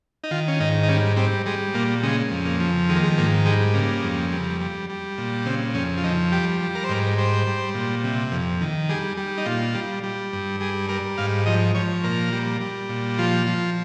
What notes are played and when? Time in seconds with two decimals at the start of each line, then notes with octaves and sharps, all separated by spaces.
0.24 D#4
0.31 D#3 F4
0.48 C#4
0.60 G#2 D#4
0.83 D#4
0.89 G3 C#4
1.17 G3 C4
1.46 G3 G#3
1.74 A#2 A#3
2.03 C#3 G#3
2.31 F2
2.45 A#3
2.60 F3
2.89 D#3 G#3
2.96 A#3
3.04 G#3
3.18 G#2 A#3
3.46 G3 G#3
3.74 C#3 A#3
4.03 F2
4.32 G3
4.61 G3
4.90 G3
5.18 A#2
5.46 C#3 C4
5.74 F2 C#4
5.97 F4
6.04 F3 D#4
6.32 G3 G4
6.61 G3
6.75 A#4
6.84 C5
6.89 G#2 A#4
7.18 G3 C5
7.47 G3
7.75 A#2
8.04 C3
8.32 F2
8.61 D#3
8.89 G3 G#4
9.17 G3
9.38 D#4
9.46 A#2 F4
9.75 G3
10.04 G3
10.33 G2
10.60 G3 G#4
10.89 G3 A#4
11.18 G#2 F5
11.46 F3 D#5
11.75 F3 C#5
12.03 A#2 A#4
12.32 G3
12.61 G3
12.89 A#2
13.18 F3 F4
13.47 F3